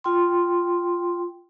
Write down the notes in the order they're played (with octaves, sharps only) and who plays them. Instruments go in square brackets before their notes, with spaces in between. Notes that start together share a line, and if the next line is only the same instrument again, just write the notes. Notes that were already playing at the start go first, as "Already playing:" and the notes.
[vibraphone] F4 G5 C6